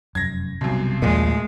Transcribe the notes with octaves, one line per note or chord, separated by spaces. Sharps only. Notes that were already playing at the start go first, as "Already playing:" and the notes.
F1 F#2 G#6 A#6
B1 F#2 C3 G3
D#2 A#2 F3 G#3 A3